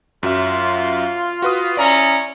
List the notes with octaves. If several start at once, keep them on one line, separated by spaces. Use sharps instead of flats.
F#2 F#3 F4 E5
F#4 B4 D#6
C#4 E4 D5 A#5 D#6